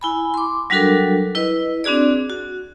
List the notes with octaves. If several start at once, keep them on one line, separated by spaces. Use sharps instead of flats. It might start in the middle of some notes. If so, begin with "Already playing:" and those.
E4 G#5 B5
C6 D6
F#3 G3 D4 F#4 A4 A#4
E4 B4 D#5
C4 D4 F#4 G#4 D5
F#4